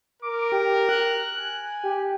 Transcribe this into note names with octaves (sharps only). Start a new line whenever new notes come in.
A#4 D6
G4
F#6
G#5
G4